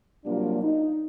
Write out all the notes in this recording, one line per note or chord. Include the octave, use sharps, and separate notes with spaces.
C3 F#3 G3 A#3 D4 F4
D#4